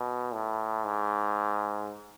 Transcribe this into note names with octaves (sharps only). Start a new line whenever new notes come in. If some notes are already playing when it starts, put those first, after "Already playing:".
Already playing: B2
A2
G#2